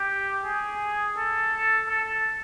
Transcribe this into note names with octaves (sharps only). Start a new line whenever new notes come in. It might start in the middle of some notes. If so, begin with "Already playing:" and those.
Already playing: G4
G#4
A4
A4